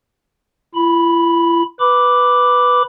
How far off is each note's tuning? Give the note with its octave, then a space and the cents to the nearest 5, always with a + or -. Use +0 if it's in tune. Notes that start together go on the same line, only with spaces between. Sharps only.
E4 +45 B5 -5
B4 +0 B5 +0 D6 +0